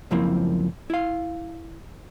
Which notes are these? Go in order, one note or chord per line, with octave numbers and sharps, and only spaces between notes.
C#2 F#2 F3 A#3 C4 E4
E4 F5